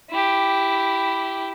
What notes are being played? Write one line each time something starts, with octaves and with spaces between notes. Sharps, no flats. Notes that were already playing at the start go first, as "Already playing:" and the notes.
E4 G4